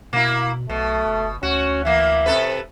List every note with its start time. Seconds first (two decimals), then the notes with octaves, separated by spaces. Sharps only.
0.13 B2 A#3 E4
0.69 B1 B2 A3
1.06 F#1
1.43 D2 C#4 F#4
1.85 E3 A#3 E5
2.26 C3 A4 B4